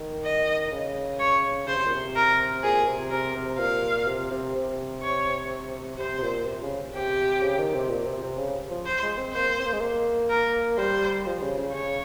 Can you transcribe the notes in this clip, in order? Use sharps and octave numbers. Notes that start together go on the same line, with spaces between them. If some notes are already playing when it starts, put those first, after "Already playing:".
Already playing: D#3
D#5
C#3
C#5
C#3 C5
C3
A#2
C3
A#4
A#2 G#4
C3
C3 A#4
C3
A#2 F5
C3
C3
C3
C#5
C3 C5
C3
A#2
C3
C#3
C3 G4
C#3
D#3
C3
A#2
C3
C3
C#3
F3
C5
G#3
C4
A#3 C5
C4
A#3
G#3
A#3
A#4
G3 C5
F3
C#3
C#3
C#3 C#5